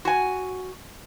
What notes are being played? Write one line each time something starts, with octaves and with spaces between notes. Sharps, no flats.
F#4 G#5